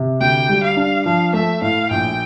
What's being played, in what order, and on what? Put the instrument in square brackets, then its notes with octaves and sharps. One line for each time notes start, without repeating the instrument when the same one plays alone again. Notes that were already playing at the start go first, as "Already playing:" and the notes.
Already playing: [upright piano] C3
[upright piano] D2 [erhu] G5
[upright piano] G3
[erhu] F5
[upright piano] D4
[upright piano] F3 [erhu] F5
[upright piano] A3 [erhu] E5
[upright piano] A2 [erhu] F5
[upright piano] A#1 [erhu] G5